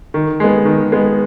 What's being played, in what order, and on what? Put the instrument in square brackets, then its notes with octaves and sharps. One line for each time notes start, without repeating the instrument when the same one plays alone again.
[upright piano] D#3
G#3 B3
D#3
G#3 B3